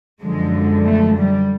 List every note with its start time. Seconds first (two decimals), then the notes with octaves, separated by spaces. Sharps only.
0.22 F#2 D3 F3 G#3
0.85 A3
1.17 G3